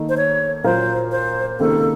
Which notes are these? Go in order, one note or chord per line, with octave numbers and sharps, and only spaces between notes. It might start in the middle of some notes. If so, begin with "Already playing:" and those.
Already playing: D#3 A#3 D#4 A4
C5
C#5
A#2 F#3 A#3 F4 A#4 C5
C5
C#2 C3 D#3 A#3 A4